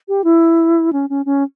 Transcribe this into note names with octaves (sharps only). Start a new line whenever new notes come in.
G4
E4
C#4
C#4
C#4